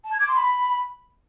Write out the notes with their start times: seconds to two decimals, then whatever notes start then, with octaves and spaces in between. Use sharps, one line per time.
0.04 A5
0.12 G#6
0.20 D6
0.28 C6
0.36 B5